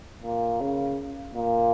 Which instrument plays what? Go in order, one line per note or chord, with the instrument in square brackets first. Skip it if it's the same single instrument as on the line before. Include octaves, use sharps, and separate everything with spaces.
[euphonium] A#2
C#3
A#2